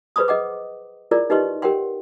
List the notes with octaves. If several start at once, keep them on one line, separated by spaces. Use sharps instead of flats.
G#4 B4 C5 B5 C#6 D#6
G#4 D#5 F#5 D6
E4 F4 G#4 A#4 C#5 D5
D#4 G4 B4 D#5 C6 C#6
G4 A#4 C#5 F#5 G5 C6